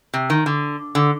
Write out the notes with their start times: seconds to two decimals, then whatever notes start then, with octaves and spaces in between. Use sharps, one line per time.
0.14 C3
0.30 D#3
0.46 D3
0.95 D3